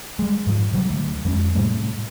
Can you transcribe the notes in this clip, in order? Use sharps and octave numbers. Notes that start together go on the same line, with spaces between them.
G3 G#3
G#2 F3
C3 F#3 G3
D2
F2 G#3 B3 C#4
A2 C3 G3 A3